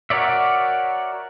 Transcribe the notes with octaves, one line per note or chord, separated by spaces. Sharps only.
F#4 A#4 C#5 D5 E5